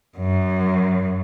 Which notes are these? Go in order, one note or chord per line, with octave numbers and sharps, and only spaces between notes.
F#2